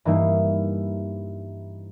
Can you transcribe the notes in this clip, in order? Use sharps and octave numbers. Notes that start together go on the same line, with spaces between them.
G2 E3 A#3 D#4 E4